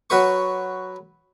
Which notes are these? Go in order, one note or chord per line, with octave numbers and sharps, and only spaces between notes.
F#3 F#4 B4 C#6